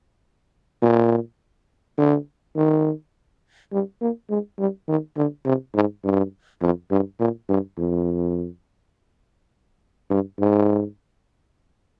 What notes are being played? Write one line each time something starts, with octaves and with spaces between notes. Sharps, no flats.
A#2
D3
D#3
G3
A#3
G#3
G3
D#3
D3
C3
G#2
G2
F2
G2
A#2
G2
F2
G2
G#2